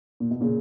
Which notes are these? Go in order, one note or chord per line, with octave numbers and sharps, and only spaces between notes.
A#2
B2
A#2 C#3